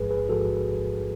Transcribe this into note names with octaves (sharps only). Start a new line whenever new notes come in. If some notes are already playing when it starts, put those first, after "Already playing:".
Already playing: A1 G#2 F3 G#3 G#4 B4
G#4 B4
A1 G#2 F3 G#3 F#4 A4